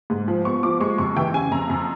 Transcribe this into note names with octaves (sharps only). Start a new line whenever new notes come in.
G#2
F3
B3 C#6
F3 D6
G#3 C#6
F2 C#6
E3 G5
C#3 G#5
F2 A#5
F2